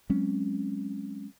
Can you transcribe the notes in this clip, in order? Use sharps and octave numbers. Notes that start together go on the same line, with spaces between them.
F#3 G#3 C4 C#4